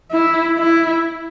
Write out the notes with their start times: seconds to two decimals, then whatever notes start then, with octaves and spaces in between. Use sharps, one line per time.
0.12 E4
0.58 E4